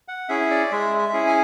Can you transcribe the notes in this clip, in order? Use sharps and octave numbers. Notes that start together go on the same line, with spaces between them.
F#5
C#4 E4 G#4 E5
D5
G#3 E5
E5
C#4 E4 G#4
G#5